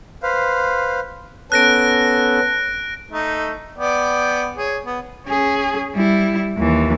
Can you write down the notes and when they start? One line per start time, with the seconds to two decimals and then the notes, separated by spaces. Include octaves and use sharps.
0.23 B4 C5 F5
1.52 B3 C#4 A4 F#6 A#6 D7
3.12 A3 D#4
3.78 B3 D5 G5
4.56 G#4 C#5
4.85 B3
5.27 C#4 G#4
5.95 G3 E4
6.57 D#2 E3